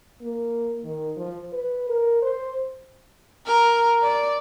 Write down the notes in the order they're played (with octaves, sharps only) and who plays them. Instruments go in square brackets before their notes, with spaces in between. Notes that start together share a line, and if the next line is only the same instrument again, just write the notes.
[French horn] A#3
D#3
F3
B4
A#4
C5
[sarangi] A#4
D5